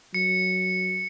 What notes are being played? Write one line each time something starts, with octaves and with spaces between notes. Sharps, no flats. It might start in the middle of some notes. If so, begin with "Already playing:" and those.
F#3 C#7